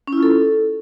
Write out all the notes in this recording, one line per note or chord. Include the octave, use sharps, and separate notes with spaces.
C#4
E4
F4
A4